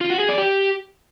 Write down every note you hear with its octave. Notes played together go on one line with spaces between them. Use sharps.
F4
F#4
G#4
D5
G4